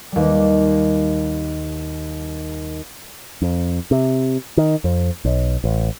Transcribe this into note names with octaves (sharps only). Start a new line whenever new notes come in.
D#2 G3
F2
C3
D#3
F2
B1
A1